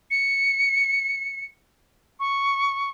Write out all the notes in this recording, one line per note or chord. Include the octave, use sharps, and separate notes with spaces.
C#7
C#6